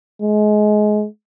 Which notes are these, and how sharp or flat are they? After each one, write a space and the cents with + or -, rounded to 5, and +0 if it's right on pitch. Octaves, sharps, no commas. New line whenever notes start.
G#3 +25